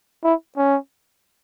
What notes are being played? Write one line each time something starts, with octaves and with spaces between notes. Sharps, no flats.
E4
C#4